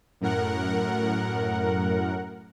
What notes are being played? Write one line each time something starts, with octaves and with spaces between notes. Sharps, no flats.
F#2 A2 A#4 F#5